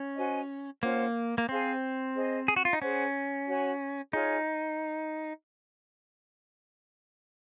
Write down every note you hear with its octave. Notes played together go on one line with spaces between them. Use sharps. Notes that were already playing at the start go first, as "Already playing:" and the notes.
Already playing: C#4
F#4 C5 D#5 G#5
A#3 C#4 F4 C5 F#5
A#3
C4 G#4 C5 F5 C6
G#4 C5 D#5
G#4
F#4
F4
D#4
C#4 G#4 C5 F#5
F#4 C#5 G#5
D#4 F4 G#4 C#5 G#5